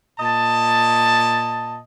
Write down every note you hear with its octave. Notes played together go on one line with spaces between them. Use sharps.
A#2 D#5 A5